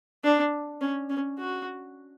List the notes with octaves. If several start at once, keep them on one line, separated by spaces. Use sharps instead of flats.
D4
C#4
C#4
F#4